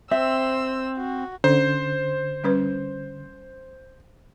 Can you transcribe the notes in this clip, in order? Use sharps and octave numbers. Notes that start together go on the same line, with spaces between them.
C4 C5 E5 E6
F#4
D3 C#4 C5
G3 C#4 B4